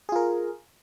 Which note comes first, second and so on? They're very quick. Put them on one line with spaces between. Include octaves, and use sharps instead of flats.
G#4 F4 A#4